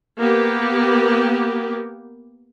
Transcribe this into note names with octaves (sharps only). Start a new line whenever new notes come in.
A#3 B3 G4